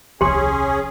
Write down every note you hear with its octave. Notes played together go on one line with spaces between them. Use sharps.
D#1 C2 F3 C#4 G4 G#4 C6